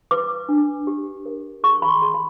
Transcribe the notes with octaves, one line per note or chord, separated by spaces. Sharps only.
B4 D6
D4
G4
A#4
G#4 C#6
B5
C6
G#4
B5